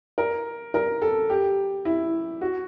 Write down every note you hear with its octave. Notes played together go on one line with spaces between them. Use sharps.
A#4
A#4
A4
G4
E4
F#4